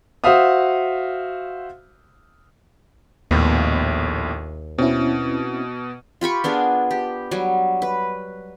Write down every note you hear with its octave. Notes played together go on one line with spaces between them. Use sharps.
F#4 C5 E5 F5 D#6
A#1 D#2 A2 B3
B2 C4 C#4 E4
F4 G4 B5 C#6
B3 D4 G#4 A#4
G4
F#3 G3
B4